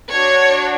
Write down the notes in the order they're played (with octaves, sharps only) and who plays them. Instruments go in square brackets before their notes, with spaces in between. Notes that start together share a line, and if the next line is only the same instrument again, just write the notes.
[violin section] D4 F#4 C#5